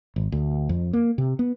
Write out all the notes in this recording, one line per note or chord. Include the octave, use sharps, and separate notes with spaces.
G#1
D2
F2
A#3
C3
B3